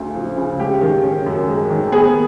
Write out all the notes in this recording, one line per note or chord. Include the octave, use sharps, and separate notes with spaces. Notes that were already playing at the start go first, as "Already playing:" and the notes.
Already playing: D2 C#3 A3
F3
C#3
G#3 G4
D#3
C#4
F#2
G#3
D#3
B3 G#4